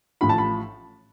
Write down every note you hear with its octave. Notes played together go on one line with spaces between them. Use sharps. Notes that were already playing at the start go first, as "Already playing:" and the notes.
A1 A2 F3 B5
A5
B5